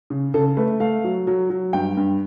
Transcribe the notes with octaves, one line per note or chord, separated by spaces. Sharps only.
C#3
C#3 A4
A3 B4
A3 F5
F#3
F#3
F#3
G2 G5
G2